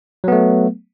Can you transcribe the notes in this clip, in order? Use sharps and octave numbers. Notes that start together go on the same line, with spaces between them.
F#3 A3 B3